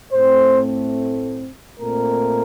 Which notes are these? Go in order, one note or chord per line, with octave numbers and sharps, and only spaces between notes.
A2 A3 C4 C5
A#2 A3 C4 A#4